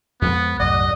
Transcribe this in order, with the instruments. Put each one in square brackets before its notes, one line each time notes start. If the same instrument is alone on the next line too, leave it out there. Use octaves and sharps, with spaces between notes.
[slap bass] F2 G#3 [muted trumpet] B3
[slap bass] C2 A2 [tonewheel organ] F#2 D5 F#5 [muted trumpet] D#5